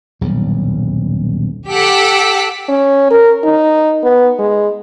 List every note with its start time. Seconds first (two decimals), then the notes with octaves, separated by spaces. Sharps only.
0.21 D#1 B1 E2 G2
1.70 G4 A4 F#5 D6 E6 B6
2.69 C#4
3.11 A#4
3.44 D#4
4.04 B3
4.39 G#3